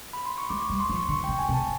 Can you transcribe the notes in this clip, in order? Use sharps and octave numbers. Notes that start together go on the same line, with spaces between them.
B5
C6
C#6
G#3 D6
G3 C#6
C6
F3
C#6
D3 C#6
C#3 G5
G#5
C3
A5